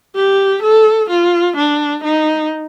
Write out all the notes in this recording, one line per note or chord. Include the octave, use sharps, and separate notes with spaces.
G4
A4
F4
D4
D#4